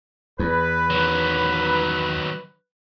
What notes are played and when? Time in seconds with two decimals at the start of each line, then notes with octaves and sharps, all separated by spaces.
0.39 E2 B4
0.90 D#3 F#3